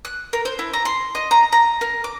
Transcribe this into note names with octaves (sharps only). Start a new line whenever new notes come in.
F#6
A#4
C5
E4
A#5
C6
D#5
A#5
A#5
A#4
D6